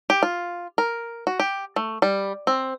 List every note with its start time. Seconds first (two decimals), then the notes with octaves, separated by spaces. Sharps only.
0.10 G4
0.23 F4
0.78 A#4
1.27 F#4
1.40 G4
1.76 A3
2.02 G3
2.47 C4